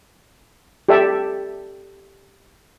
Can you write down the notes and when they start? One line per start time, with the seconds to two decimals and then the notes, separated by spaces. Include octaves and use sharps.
0.89 G4 A4 D5 E5